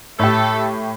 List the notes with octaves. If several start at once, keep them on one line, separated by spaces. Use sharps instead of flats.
A2 A3 G4 A4